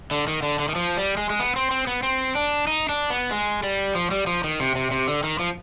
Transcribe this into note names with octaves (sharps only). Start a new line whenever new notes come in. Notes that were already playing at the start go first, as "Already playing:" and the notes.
D3
D#3
D3
D3
D#3
F3
G3
G#3
G#3
B3
C4
C4
B3
C4
D4
D#4
D4
B3
G#3
G3
F3
G3
F3
D#3
C3
C3
C3
D3
D#3
F3